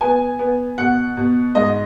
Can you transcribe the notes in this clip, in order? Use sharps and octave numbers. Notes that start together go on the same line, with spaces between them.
B3 G#5
B3
B2 F#5
B2
G#2 D#5